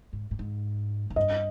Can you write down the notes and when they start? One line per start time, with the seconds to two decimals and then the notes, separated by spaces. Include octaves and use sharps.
0.13 G#2
0.31 A2
0.39 G#2
1.10 G#2
1.16 G2 D#5